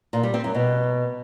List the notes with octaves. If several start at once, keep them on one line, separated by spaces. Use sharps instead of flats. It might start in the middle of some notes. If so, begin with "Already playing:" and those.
A#2
G3
C4
F#2
B2